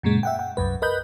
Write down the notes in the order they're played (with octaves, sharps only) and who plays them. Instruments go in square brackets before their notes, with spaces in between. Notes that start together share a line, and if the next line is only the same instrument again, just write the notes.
[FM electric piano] F#2 A#2 C#3 G#3
E5 F#5 G5
F#5 G5
C2 F#2 B4
A#4 B4 D#5 B5 F#6 G6